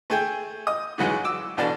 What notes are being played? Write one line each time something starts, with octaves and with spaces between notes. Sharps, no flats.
A3 G#4 G5
D#5
G#2 C#3 E3 F#3 G#3
D6 E6
A1 B2 D4 A4